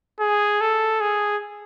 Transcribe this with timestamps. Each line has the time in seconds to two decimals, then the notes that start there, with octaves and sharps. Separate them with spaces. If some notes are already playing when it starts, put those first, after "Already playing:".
0.20 G#4
0.61 A4
1.01 G#4